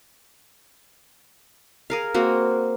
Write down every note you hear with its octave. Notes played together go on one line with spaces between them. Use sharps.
G#4 A#4 F5
A#3 C4 F#4